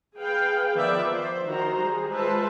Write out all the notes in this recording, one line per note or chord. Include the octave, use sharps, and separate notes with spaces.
G#4 B4 F5 G5
D#3 F3 B3 B4 D5 E5
C5
D#3 F#4 C5 A#5
G3 G#4
G#3 F4 B4 C5 E5 A5